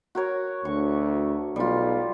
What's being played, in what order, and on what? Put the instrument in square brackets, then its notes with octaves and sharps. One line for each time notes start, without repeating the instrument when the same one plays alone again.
[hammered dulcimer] F#4 A#4 C#5
[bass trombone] D2 [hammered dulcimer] C#6
[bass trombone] B1 [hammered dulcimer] G3 F4